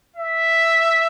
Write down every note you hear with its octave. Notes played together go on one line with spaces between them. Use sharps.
E5